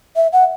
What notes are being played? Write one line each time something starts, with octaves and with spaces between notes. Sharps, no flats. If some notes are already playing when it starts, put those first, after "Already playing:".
E5
F#5